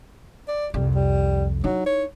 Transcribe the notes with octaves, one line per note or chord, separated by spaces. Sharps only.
D5
C2 F2 G3
G3
F#3 D#4 E4
C#5